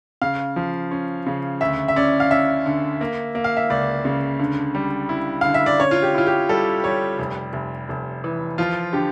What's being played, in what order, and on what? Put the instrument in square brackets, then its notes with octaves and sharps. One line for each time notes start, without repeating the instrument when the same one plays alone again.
[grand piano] C#3 [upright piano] F5
[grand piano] F3
C#4
C#3
[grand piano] D2 [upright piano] E5
[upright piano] E5
[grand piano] C#4 [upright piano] D5
[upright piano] F5
[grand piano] C#4 [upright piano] E5
[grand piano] D3
A#3
A#3
[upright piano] F5
E5
[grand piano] C#2 [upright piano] D5
[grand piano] C#3
D3
G3
E4
[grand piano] D3 [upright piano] F5
[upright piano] E5
D5
[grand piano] C#4 [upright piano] C#5
[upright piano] F4
G4
[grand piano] E4 [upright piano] F4
[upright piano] G4
[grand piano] G3 [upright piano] A4
[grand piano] G3 [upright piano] C#5
[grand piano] F1
F1
F1
E3
[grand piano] F3 [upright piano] F4
[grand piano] D3 [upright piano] G4